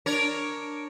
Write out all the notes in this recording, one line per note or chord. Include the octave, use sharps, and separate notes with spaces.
D4 A#4 C#5